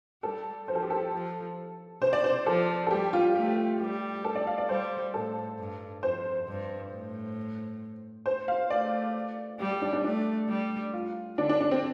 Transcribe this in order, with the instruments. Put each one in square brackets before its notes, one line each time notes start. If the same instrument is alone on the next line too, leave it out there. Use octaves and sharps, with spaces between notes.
[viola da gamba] G3 [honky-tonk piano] A4
[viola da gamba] F3 [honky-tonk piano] C5
[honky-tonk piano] A4
G4
A4
[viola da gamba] F3
[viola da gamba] C3 [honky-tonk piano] C5
[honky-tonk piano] D5
C5
[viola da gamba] F3 [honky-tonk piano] A4
[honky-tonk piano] A4
[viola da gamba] G3 [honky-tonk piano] G4
[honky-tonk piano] F4
[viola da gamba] A3 [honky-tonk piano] G4
[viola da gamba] G3 [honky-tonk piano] G4
[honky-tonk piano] A4
D5
F5
D5
[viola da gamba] G3 [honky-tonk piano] C5
[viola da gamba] A2 [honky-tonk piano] A4
[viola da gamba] G2
[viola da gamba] F2 [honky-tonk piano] C5
[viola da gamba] G2
A2
[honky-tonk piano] C5
F5
[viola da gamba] A3 [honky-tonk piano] D5
[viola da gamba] G3 [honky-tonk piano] G4
[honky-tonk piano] G4
D4
D4
[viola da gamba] A3 [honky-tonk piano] D4
[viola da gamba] G3
[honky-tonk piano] F4
[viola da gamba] D3 [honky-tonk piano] D4
[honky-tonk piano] D4
D4
C4